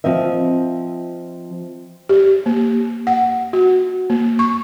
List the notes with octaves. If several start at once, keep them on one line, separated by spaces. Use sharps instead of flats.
F3 C4 D#5 E5
G4
A#3
F#5
F#4
A#3
C#6